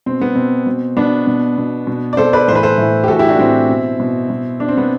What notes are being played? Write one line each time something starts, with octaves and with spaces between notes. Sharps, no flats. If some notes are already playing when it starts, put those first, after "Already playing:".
B2 C4
B3
B2 C4
B2
B2 B3 D4
B2
B2
B2
D5
B2 A4 C5
B4 D5
A2 E3 B4 C5
A4 C5
A2 E3
G4
A2 E3 F#4 A4
E4 G4
D4 F#4
A2 E3 C4 E4
B2
B2
B2
B2 D4
C4
B3